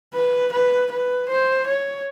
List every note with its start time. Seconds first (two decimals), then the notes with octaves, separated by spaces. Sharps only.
0.14 B4
0.52 B4
0.91 B4
1.29 C5
1.66 C#5